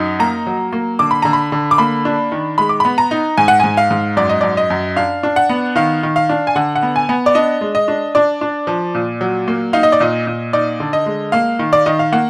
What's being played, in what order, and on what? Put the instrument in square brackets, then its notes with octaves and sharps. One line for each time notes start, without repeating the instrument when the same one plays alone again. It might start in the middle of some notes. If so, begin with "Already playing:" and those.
Already playing: [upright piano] F#2 D#4
A#3 A#5
F#3
A#3
D3 D6
B5
D3 A#5
B5
D3
D6
A#3 B5
D4
D#3
G#3 B5
D6
B3 B5
A#5
D#4
G#2 G#5
F#5
G#2 G#5
F5
G#2
F#2 D5
D#5
F#2 D5
D#5
F#2
D4 F5
D4
F#5
B3
D#3 F5
D#3
F5
D4
G#5
D3 F#5
F#5
B3
G#5
B3
D5
D4 D#5
G#3
D#5
D4
D4 D5
D4
F3
A#2
F#3
A#3
D#4 F5
D#5
D5
A#2 D#5
A#2
D#4 D5
D3
D#5
G#3
A#3 F5
D#3
D5
D#3 D#5
F5
A#3 F#5